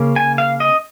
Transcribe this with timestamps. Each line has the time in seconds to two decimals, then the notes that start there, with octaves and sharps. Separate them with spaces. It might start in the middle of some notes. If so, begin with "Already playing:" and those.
Already playing: C#3 A#3 C#4
0.16 G#5
0.38 F5
0.60 D#5